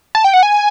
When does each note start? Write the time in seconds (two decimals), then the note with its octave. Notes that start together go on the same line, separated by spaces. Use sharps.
0.15 A5
0.24 G5
0.34 F#5
0.43 G#5